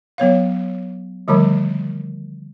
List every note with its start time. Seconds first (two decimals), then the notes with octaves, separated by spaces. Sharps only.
0.18 F#3 B3 C#5 F5
1.28 D3 D#3 F3 G3 A3